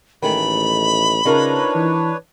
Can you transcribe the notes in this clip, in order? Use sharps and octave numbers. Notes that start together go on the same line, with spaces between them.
A1 D#3 G#3 A3 B5
C#3 D4 D#4 F4 A#4 B4 C#5
E3